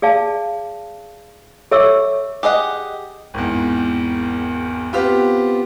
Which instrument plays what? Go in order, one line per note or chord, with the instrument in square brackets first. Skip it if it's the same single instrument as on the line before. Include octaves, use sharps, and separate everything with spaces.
[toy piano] G#4 D5 F5 A5
A4 C#5 E5 C#6 D6 E6
[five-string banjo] G4 G#4 D#5 F#5
[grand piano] G#1 E2
B3 C4 F4 G4